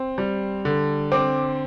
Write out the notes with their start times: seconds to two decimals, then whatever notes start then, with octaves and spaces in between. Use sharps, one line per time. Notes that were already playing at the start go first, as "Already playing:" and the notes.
Already playing: C4
0.18 G3
0.65 D3
1.12 C4 D6